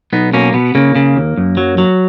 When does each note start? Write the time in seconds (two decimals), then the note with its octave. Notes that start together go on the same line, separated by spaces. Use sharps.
0.13 B1 B3 D#4
0.33 B2 A#3 C#4
0.54 B2 B3
0.75 C#3 A#3
0.95 C#3
1.16 D#2
1.37 F#2
1.57 F#3
1.78 F#3